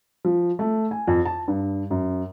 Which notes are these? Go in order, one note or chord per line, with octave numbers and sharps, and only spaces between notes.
F3
A3
G#5
F2
A5
G2
F#2